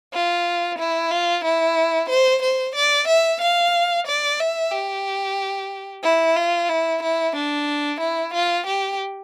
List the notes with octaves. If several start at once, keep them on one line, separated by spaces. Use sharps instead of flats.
F4
E4
F4
E4
C5
C5
D5
E5
F5
D5
E5
G4
E4
F4
E4
E4
D4
E4
F4
G4